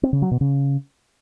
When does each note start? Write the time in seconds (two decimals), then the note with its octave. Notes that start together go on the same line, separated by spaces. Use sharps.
0.03 C4
0.13 C#3
0.22 F#3
0.31 B2
0.41 C#3